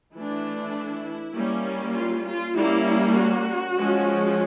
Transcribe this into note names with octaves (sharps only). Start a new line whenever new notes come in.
E3 A3 D4 E4
G3 A#3 C#4
F4
F4
G3 A#3 C#4 E4
F#4
F3 G#3 C#4